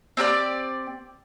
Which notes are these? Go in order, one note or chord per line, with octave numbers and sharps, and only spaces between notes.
C4 G4 A#4 D5